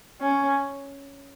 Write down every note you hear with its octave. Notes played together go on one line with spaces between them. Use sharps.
C#4